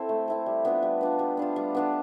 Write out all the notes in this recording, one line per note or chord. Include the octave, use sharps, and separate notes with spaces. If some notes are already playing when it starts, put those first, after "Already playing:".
Already playing: C4 E4 A4
A3
C4 E4 A4
G3
B3 D4 F4
G3
B3 D4 F4
G3
B3 D4 F4
G3
B3 D4 F4